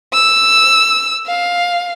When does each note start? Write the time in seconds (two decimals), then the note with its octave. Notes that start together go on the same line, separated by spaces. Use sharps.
0.13 E6
1.27 F5